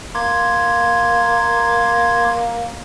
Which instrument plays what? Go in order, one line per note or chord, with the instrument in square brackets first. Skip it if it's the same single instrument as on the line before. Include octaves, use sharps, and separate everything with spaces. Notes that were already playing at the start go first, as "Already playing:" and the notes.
[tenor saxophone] A#3 [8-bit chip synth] C6 D6 G#6